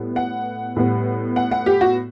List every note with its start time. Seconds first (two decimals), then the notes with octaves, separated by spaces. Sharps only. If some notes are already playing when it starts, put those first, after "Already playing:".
Already playing: A2 G3 B3
0.16 F#5
0.76 A2 G3 B3
1.36 F#5
1.51 F#5
1.66 G4
1.81 F#4